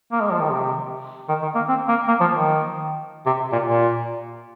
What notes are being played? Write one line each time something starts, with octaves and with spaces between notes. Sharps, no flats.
A#3
G#3
F3
D#3
C3
D#3
D#3
A#3
C4
A#3
A#3
F3
D#3
C3
A#2
A#2